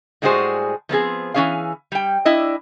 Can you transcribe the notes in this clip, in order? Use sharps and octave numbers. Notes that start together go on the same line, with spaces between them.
A2 G3 G#3 F#4 G#4 C5
F3 B3 C4 G#4
E3 C4 C#4 G#4 F5
G3 G5
D4 E4 D#5